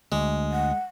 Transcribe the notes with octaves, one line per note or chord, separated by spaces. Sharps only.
D2 G#3
F#5